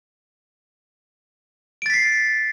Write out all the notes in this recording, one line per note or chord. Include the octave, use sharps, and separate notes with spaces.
A6 B6 C7 D7